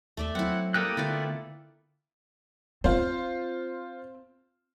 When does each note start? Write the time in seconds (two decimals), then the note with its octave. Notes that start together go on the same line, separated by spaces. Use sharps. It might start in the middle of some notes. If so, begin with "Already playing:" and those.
0.17 D#2 A3 D5 E5
0.35 F#3 C4 E4 F#5
0.74 G3 A#3 A4 D5 G5 A#5 D#6 F#6
0.97 D3 A3 B3 E4 F4 D5
2.84 C4 F4 C5